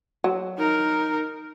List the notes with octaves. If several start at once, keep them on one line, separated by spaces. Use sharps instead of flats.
F#3
D#4 A#4